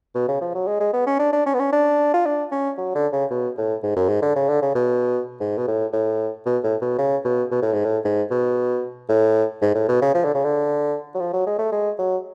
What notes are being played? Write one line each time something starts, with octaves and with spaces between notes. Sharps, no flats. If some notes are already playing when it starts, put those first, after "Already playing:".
B2
C#3
F3
F#3
G#3
G#3
B3
C#4
D4
D4
C#4
B3
C#4
D4
F4
D4
C#4
F#3
D3
C#3
B2
A2
G#2
F#2
G#2
D3
C#3
D3
C#3
B2
G#2
B2
A2
A2
B2
A2
B2
C#3
B2
B2
A2
G#2
A2
G#2
B2
A2
G#2
A2
B2
C#3
F3
D3
C#3
D3
F#3
F3
F#3
G#3
A3
G#3
F#3